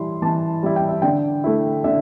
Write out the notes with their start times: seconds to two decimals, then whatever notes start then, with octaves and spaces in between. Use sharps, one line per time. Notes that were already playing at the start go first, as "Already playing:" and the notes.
Already playing: E3 G3 E4 C6
0.22 E3 A5
0.63 G3 E4
0.76 G5
0.89 E5
1.02 D3 G5
1.44 A3 E4
1.84 D3 E5